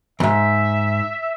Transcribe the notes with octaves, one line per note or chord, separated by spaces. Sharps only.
E2 G#2 E5